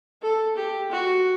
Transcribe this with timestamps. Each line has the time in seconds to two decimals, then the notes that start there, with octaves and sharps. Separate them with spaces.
0.22 A4
0.56 G4
0.91 F#4